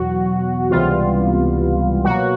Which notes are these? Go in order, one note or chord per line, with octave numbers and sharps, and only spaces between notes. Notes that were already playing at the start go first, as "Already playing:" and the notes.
Already playing: E2 B2 F#3 F#4
C#2 C3 E3 G3 B3 F4
B2 F#3 A#3 F#4